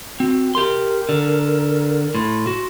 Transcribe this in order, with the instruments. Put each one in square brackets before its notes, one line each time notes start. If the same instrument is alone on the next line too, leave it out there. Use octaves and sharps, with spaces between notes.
[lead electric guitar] C4 [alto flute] F#4
[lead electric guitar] G4 C6 [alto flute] A#4
[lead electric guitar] D3
[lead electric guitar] A2 [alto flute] C6
[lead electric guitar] F#4